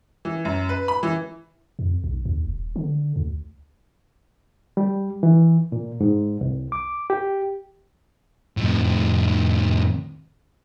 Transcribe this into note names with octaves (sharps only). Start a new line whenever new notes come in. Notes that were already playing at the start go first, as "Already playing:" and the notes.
E3
F#2
B4
B5
E3
F2
B1
D#2
D#1
D3
D2
G3
E3
A#2
G#2
C2
D6
G4
F2 A2